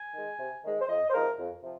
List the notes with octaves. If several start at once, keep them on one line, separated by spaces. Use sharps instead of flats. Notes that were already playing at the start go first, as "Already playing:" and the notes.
Already playing: G#5
D#3 G#3
C3
D#3 G#3
C5
F2 D#5
C5
C3 F3 G#3 D#4 A#4
F2
C3 F3